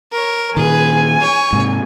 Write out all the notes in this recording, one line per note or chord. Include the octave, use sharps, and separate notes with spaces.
A#4 C#5
A#2 D#3 G#4 B4 G#5
C#5
G#2 C3